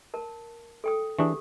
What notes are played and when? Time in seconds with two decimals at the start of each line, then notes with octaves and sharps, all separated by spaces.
0.14 A#4 A5
0.84 A4 G5 D#6
1.19 E3 D4 G4 G#4 D#6